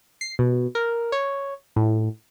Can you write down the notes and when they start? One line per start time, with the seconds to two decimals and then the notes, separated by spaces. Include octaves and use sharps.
0.21 C7
0.39 B2
0.75 A#4
1.12 C#5
1.76 A2